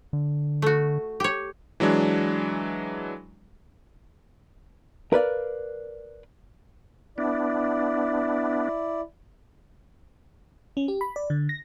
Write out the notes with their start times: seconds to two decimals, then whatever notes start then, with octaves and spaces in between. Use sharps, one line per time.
0.13 D3
0.62 A3 F#4
1.20 G4 C#5
1.80 E3 F#3 G#3 D4
5.13 A#4 B4 D5 F5
7.18 B3 D4 E4 D5
10.77 C#4
10.88 G4
11.01 B5
11.16 D5
11.30 D3
11.49 A#6